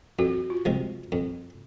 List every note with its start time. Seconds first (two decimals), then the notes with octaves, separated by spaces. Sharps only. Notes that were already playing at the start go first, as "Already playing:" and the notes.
0.19 F2 F#4
0.50 F4
0.65 C3 F3 G#3
1.12 F2